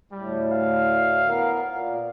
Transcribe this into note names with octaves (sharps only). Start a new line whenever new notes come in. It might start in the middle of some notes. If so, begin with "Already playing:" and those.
D2 A2 G3
F5
B3 A#4
A#2